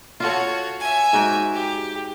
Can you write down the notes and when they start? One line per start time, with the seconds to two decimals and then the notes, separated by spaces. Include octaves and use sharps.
0.20 F4 F#4 A4 C#5
0.80 E5 G#5
1.13 G#2 F#4 G5
1.54 G4